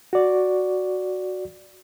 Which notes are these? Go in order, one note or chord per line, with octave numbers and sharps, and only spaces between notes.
F#4 D5